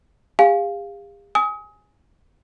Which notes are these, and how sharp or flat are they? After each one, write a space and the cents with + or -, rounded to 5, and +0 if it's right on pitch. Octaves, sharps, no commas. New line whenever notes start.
G4 +45 F5 +0 G#5 +0
G#5 +0 D#6 +30